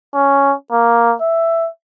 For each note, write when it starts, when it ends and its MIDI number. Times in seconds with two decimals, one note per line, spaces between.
0.14 0.54 61
0.72 1.15 58
1.21 1.69 76